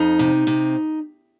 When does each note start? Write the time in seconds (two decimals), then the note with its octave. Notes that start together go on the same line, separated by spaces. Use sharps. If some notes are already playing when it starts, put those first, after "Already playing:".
Already playing: F2 D#4
0.19 C3
0.47 C3